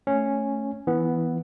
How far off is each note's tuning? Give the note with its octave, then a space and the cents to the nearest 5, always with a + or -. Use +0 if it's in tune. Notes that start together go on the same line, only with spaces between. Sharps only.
A3 +0 C#4 -5
E3 +0 B3 +0